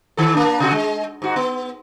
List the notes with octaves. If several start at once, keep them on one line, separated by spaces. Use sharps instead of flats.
D#3 A4
A#3 D4
C3 F#4
G#3
G#2 F#4
B3